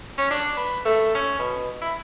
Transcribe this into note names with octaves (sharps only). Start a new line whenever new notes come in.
C#4
D4
B4
A3
C#4
B2
E4